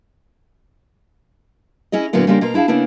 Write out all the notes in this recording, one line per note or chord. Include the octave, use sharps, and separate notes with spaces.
C#4 E4 G#4 D#5
A#2 D3 F#3 A#3 B3 E4
C#3 G3 A#3 D4 G4 C5
B2 A#3 C5 A#5
D4 E4 G#4 F5 A5
C#3 A#3 B3 D4 E4